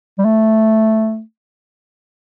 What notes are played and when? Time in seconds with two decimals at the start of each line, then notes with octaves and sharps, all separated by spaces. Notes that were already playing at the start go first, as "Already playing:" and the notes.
0.19 G3
0.25 A3